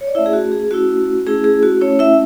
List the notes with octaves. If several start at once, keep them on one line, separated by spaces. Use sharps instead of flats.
C#5
D5
A3 C#4 E4 E5
G#4
F#4
G#4
A3 C#4 E4 F#4
A3 C#4 E4 G#4
G#4
F#4
A3 C#4 E4 C#5
E4 E5